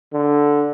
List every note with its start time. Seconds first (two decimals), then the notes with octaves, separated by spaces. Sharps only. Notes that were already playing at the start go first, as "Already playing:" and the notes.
0.13 D3